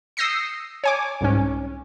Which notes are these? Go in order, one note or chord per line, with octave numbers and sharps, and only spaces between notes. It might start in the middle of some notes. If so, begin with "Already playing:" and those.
D#6 E6 G6 A#6 C7 C#7
C#5 G#5 D6
C2 G#2 C#4